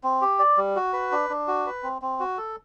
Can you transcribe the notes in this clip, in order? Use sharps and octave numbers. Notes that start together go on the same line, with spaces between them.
C4
G4
D5
G3
F#4
B4
D4
D4
F#4
B4
C4
C4
F#4
A4